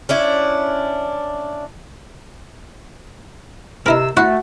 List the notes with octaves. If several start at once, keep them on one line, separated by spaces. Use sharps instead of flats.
C#4 D4 E4
C3 D#4 E4 A#4 B4 E6
A3 E4 F#4